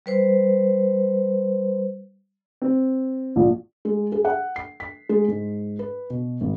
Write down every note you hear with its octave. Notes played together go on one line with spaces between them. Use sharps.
G3 B4 C5
C4
A#1
G#3
G#4
F#5
C7
B6
G#3
G#2
B4
B2
G#1